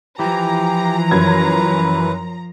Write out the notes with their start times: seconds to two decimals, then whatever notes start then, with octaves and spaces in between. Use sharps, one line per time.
0.19 E3 F3 G4 A#5
1.11 F#2 B4 G#6